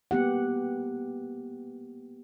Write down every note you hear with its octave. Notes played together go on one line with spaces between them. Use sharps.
A#3 B3 G4 F#5